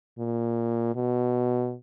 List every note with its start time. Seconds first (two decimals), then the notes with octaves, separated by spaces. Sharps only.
0.18 A#2
0.95 B2